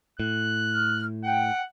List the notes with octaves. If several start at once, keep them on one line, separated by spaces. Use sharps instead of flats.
A2 F#6
F6
F#5 G5